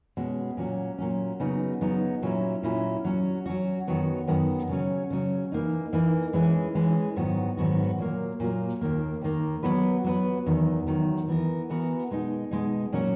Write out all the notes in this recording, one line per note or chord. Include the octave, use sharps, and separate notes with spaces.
B2 G#3 C#4
A#2 F#3 C#4
A#2 F#3 C#4
C#3 F#3 B3 D#4
C#3 F#3 B3 D#4
A#2 F#3 C#4 E4
A#2 F#3 C#4 E4
F#3 C#4 F#4
F#3 C#4 F#4
F#2 D#3 F#3 B3
F#2 D#3 F#3 B3
C#3 F#3 C#4
C#3 F#3 C#4
E3 A#3 D#4
E3 A#3 D#4
E3 G#3 C#4 G#4
E3 G#3 C#4 G#4
G#2 D#3 F#3 B3 F#4
G#2 D#3 F#3 B3 F#4
A#2 F#3 A#3
A#2 F#3 A#3
D#2 D#3 A#3
D#2 D#3 A#3
F#3 B3 F#4 B4
F#3 B3 F#4 B4
E2 D#3 F#3
E2 D#3 F#3
E3 B3 F#4 A#4
E3 B3 F#4 A#4
B2 G#3 D#4
B2 G#3 D#4
A#2 F#3 C#4 F#4